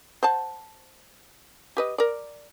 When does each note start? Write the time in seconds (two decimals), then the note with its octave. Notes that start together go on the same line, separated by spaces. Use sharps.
0.23 C5 F#5 A5
1.77 G4 B4 D#5
1.98 A#4 D5